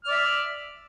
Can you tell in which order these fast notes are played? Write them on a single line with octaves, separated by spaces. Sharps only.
F6 D5 E5